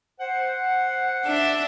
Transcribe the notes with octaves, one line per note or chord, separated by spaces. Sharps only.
C5 F#5
D4 D5 E5